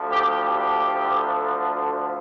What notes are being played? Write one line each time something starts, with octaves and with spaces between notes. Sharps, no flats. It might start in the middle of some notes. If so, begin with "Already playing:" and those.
Already playing: D2 D3 F3
G4
G4